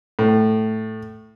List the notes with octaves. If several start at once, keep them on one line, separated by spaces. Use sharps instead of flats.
A2